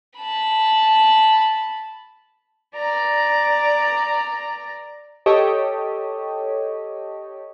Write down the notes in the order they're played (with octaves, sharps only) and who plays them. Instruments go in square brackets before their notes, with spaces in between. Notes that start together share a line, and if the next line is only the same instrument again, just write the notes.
[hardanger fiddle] A5 B5
D5 A#5
[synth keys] G4 A4 C#5 D#5